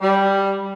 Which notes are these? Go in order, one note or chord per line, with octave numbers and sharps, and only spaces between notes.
G3